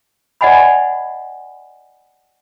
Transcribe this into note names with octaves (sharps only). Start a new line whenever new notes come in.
D5 D#5 F#5 G#5 B5